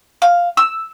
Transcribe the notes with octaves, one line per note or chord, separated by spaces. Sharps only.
F5
E6